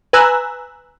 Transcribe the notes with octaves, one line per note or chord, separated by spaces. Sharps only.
B4 G#5 A#5 E6 F#6